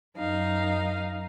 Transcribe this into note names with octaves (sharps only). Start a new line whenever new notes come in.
F#2 D#4 F5